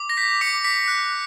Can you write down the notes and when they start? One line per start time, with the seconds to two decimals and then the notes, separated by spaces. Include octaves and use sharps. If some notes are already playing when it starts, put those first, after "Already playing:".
Already playing: D6
0.09 A#6
0.17 G6 B6
0.41 D6 C#7
0.64 D6 B6
0.88 F#6